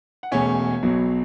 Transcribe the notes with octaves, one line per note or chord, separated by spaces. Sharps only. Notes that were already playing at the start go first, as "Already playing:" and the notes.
F#5
E1 E2 B2 A3 C#4 C#5 E5
B1 B2 F#3